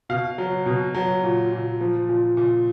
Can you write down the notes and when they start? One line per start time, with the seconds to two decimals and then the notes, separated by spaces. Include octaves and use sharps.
0.09 B2 F5
0.38 F#3
0.66 B2
0.94 F#3
1.24 A#2
1.52 A#2
1.81 F3
2.09 A#2
2.37 A#2